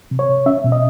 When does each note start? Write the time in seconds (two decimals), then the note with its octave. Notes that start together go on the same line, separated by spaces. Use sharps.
0.11 C3
0.19 C#5
0.29 C3
0.46 C#4 E5
0.64 B2
0.72 D#5